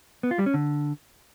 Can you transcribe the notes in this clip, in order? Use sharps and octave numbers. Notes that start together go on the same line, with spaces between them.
B3
F4
G3
C#4
D3